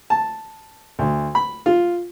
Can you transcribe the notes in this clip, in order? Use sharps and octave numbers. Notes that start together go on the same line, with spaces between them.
A5
D2
B5
F4